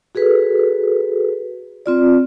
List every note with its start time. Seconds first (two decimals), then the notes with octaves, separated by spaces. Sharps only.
0.15 F#4 G#4 A4 B4
1.86 C4 F4 D5